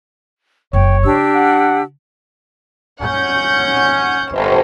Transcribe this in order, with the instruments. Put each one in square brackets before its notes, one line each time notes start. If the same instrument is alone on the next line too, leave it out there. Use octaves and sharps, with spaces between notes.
[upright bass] F#1 F#2 [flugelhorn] C#5 [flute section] G5
[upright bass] C#3 [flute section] D4 G4 E6
[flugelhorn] F#5
[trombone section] C#4 [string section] F#5 G6
[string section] G1 C5